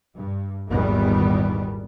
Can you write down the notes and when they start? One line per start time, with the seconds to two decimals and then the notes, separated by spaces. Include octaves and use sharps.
0.15 G2
0.69 G#1 E2 A#2 D#3 G3 B3